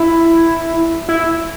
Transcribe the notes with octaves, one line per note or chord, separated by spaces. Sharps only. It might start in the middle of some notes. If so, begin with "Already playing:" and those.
Already playing: E4
E4